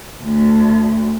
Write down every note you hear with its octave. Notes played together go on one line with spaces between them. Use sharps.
D2